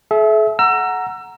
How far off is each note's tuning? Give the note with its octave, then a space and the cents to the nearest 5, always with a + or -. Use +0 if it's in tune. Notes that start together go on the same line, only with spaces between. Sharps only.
A4 -45 E5 +0
F#5 +0 A#5 +0 E6 +30